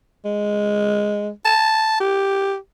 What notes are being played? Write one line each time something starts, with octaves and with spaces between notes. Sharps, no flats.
G#3
A5
G4